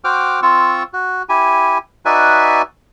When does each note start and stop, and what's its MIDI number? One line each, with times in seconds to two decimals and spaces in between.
0.04 0.40 66
0.04 0.40 72
0.04 0.40 79
0.04 0.40 86
0.04 0.40 89
0.42 0.83 60
0.42 0.83 65
0.42 0.83 85
0.42 0.83 88
0.93 1.23 66
1.29 1.78 64
1.29 1.78 67
1.29 1.78 80
2.05 2.62 63
2.05 2.62 66
2.05 2.62 71
2.05 2.62 74
2.05 2.62 76
2.05 2.62 80